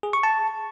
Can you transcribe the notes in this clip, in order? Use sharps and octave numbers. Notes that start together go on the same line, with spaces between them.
G#4
C#6
A5